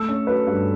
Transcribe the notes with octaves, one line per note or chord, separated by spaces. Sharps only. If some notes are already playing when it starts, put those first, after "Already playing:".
Already playing: A3 A4
C#4
F#3 B4
G2